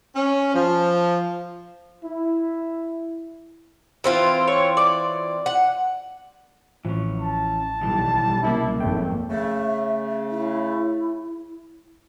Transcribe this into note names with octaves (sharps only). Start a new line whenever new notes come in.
C#4
F3
E4
E3 C4 F4
C#5
D5
F#5
A1 E3 F3 C#4
A5
B1 D#3 E3 G3 E4
C2 F#2 C#3 A#3 E4
G#1 F2 A3 G5
C#3 A3 E5
E4